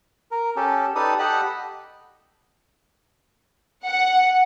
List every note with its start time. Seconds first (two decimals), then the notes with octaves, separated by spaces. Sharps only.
0.31 A#4
0.56 C#4 G4 A4
0.95 D#4 G4 A4 B4 D5 D#6
1.19 G4 A4 D#5 F#5 B5
3.86 F#5